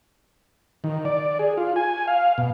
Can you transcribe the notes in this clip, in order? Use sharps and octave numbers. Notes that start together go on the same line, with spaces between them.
D#3
D5
G#4
F4
G#5
F5
B2